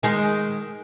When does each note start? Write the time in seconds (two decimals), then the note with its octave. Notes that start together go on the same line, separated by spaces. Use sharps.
0.03 D#3 G#3